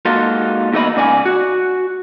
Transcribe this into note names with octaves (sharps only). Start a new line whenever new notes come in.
G#3 A#3 D#4 F4 F#4 A4
E2 G#2 A3 A#3 D#5 B5
G#2 C#3 D5 G#5
F#4